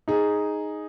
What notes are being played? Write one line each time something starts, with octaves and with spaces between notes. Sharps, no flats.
D#4 G#4